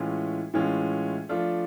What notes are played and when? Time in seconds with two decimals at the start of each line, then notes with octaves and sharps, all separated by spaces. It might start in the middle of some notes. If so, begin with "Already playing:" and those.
Already playing: A2 E3 G#3 C#4 F4
0.54 A2 E3 G#3 C#4 F4
1.29 F3 A3 D4 F4